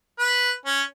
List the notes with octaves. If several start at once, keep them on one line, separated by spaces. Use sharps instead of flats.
B4
C#4